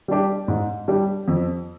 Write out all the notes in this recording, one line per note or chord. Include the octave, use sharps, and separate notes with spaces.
G3 D4 G4
G#2
G3 D4 G4
F2